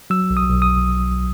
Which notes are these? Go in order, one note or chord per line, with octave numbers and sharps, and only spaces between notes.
F#3 E6
B1
D#6
B1
D#6